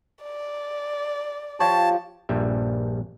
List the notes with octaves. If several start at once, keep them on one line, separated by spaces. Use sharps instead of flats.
D5
F3 G4 C#5 A5
A#1 G2 G3 E5